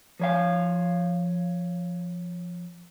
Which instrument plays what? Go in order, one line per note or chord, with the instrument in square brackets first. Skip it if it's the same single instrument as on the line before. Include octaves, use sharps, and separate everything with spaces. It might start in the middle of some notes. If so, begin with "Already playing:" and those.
[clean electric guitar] F3 C#5 F5